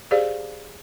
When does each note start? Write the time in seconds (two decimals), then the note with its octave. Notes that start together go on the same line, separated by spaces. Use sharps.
0.11 G4 G#4 C5 D5 F5